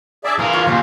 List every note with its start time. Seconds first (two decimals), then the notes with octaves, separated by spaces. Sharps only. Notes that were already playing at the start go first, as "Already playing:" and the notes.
0.24 D4 G#4 D5 E5 D6
0.39 E3 G#4 A#4 F5 C6
0.53 C#4 F4 C#5
0.67 D#2 C#3 C5 E5